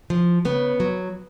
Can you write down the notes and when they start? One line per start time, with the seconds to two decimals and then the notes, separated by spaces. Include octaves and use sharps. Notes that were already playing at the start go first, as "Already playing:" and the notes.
0.10 F3
0.45 C#3 B3
0.80 F#3